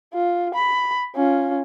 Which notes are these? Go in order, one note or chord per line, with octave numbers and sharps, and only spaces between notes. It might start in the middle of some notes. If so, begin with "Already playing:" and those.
F4
B5
C#4 F4